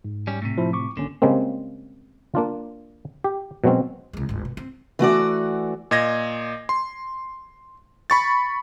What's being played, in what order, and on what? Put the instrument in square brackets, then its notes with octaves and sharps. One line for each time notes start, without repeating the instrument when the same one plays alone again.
[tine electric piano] G#2
[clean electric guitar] G3 C#4
A2 C3
[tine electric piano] F3 E4
C#6 D6
[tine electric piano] G#1 A#3 C#4 [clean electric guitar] D3
[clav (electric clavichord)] C#3 G3 G#3 A#3 C4
A#3 D4 F4
G4
B2 F#3 G#3 C4 C#4
[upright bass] C2 G#3
G1 D2
B2
C4
[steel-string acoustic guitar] E3 A3 F#4 D5
[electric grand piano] A#2 D#5 G#6 A#6
C6
B5 C#6 A6